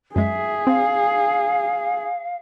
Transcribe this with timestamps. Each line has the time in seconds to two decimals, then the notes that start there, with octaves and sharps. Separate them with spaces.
0.16 F#2 G#3 G#4 E5
0.67 C4 F5